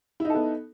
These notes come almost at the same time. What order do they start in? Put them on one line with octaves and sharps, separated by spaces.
E4 D#4 A4 B3